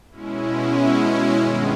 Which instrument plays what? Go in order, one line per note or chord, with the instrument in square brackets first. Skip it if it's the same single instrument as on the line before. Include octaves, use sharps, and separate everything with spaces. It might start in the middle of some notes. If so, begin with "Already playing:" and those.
[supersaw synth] B2 G#3 C#4 E4
G2 D#3 G#3 B3